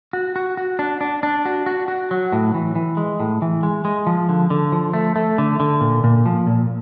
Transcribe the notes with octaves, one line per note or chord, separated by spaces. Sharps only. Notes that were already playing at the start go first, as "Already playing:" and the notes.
F#4
F#4
F#4
D4
D4
D4
F#4
F#4
F#4
F#3
A2
E3
E3
G#3
A2
E3
G#3
G#3
F3
D3
D3
F3
A3
A3
D3
D3
A#2
A#2
F3
A#2